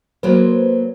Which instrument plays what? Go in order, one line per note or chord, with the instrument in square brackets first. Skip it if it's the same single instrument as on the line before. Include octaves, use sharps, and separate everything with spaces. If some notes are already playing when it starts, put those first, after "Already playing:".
[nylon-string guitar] F#3 A#3 B3 [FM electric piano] B4 C5